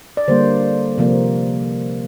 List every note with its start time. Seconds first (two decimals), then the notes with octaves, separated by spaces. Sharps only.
0.17 D5
0.28 D3 G3 A#3 C5
0.98 C3 F3 A#3